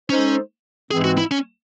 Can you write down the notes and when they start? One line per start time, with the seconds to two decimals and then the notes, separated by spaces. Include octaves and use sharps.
0.09 G#3 C#4 D#4 A4 C5
0.91 G#2 E3 G#3 C4 G#4
1.04 F#4
1.18 E4
1.31 C#4